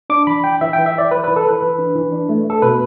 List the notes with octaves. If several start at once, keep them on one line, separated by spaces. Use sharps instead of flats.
D4 D6
E3 B5
E3 G5
E3 E5
G5
E3
E5
E3 D5
E3 B4
B4
E3
A4
E3 B4
E3
D4
E3
D4
A3
A3 A4
B2 B4